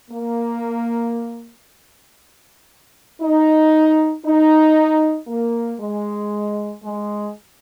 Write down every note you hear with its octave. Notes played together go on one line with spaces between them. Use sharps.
A#3
D#4
D#4
A#3
G#3
G#3